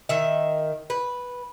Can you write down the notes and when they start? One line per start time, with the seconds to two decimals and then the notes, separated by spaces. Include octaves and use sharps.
0.09 D#3 E5
0.90 B4